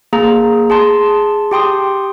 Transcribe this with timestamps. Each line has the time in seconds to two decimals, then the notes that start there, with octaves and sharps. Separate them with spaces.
0.13 A#3 G#4 A#5
0.70 G#4 A5 C6
1.51 G4 G5 C6 D#6